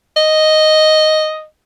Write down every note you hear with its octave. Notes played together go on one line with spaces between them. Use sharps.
D#5